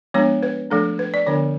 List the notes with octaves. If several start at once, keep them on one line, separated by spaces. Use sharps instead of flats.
F3 G#3 B3 D4 C#5
B4
F3 A3 D4 A4
B4
D5
D3 F3 B3 D4 C#5